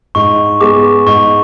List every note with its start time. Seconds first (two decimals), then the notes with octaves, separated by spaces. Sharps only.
0.15 G#2 C#6
0.61 G#3 B3 D6
1.06 G#2 C#6